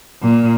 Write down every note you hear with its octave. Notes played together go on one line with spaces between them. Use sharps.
A#2